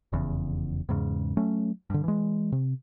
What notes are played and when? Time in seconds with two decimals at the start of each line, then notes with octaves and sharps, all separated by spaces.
0.13 F1 E2 C#3
0.89 E2 G#2 C#3
1.37 F#3 A3 C#4
1.90 G2 D3
2.04 E3 G#3
2.52 C3